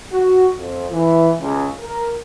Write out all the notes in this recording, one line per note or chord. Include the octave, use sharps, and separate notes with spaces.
F#4
F2
E3
C#2
A#4